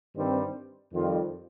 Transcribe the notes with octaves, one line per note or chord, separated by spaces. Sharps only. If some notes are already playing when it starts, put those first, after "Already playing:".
G2 D#3 G3 C4
F2 D#3 G3 F4